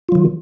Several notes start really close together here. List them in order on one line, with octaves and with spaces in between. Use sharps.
F4 F#3 D#3